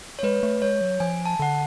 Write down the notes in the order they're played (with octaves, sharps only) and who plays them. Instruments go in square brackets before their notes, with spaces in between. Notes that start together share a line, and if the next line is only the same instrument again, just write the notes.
[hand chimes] C#5
[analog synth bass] G#3 [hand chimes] B4
[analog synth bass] A3
[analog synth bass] G#3 [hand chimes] C#5
[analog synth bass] F#3
[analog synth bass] F3 [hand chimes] G#5
[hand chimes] A5
[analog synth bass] D3 [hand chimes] F#5